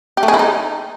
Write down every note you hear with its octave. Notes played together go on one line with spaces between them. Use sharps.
G4
A3
G#4
E4
D#4